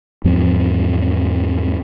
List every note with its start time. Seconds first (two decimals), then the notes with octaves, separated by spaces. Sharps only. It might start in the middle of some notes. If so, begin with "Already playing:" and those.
0.24 E2 G#2 F3 C4